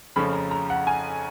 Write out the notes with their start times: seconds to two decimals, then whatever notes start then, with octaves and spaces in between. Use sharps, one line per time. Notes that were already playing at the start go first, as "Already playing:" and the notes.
0.16 F2 C#3 F3 A3 C#4 B5
0.33 A#5
0.51 A#5
0.70 F#5
0.87 G#5